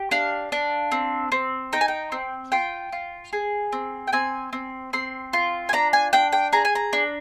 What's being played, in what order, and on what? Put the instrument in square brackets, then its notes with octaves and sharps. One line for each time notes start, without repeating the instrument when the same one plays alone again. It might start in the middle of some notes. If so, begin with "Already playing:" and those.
Already playing: [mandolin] G4
D4 F5
D4
C4
C4
D#4 G5
G#5
G5
C4
F4 G5
F4
G#4
C4
G5
C4 G#5
C4
C4 C6
F4
G#5
D4 A#5
G#5
D4 G5
G5
G#4 A#5
G#5
A#5
D4